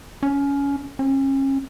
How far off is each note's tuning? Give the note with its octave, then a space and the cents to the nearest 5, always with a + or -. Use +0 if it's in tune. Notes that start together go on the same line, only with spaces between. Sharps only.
C#4 +20
C#4 -35